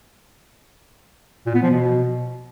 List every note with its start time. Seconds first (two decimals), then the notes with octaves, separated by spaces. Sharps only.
1.47 A#2
1.55 B3
1.63 F3
1.71 B2